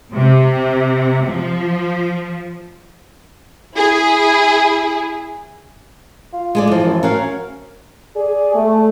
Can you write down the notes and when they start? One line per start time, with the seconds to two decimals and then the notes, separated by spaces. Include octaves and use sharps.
0.12 C3
1.26 F3
3.77 E4 G#4
6.33 F4
6.55 G#3 G#4 D5
6.67 E3 F3
6.86 F#2
7.03 C#4 F#4 A#4 F5
8.16 G#4 D5
8.54 A3